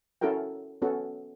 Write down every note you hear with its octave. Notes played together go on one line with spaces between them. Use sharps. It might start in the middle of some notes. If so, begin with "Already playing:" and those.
C#4 E4 F#4 A4 A#4 G5
B3 C#4 F#4 A4